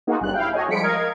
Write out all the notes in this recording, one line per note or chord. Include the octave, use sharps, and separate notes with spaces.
A#3 D#4 F4 F#4 G#4
G1 F#2 G3 F#6
E4 F5 G5
F#4 A4 C#5 D#5 G#5
F3 G3 G#3 B6 C#7 D7
A#4 D#5 F5 G#6